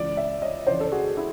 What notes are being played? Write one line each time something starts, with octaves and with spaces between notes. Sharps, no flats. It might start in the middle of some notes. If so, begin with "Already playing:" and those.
Already playing: C#2 C#3 E3 D5
D5 E5
C#5 D#5
F2 C#3 E3 C5 D5
A4
F#4 G#4
E4 F#4